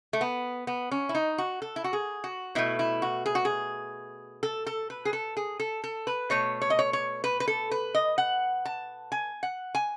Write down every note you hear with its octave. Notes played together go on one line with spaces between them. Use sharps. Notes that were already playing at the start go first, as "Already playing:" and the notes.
A3
B3
B3
C#4
E4
D#4
F#4
A4
E4
F#4
G#4
F#4
B2 A3 E4
E4
F#4
G#4
F#4
G#4
A4
A4
B4
G#4
A4
G#4
A4
A4
B4
B2 A3 C#5
C#5
D#5
C#5
C#5
B4
B4
A4
B4
D#5
F#5
A5
G#5
F#5
G#5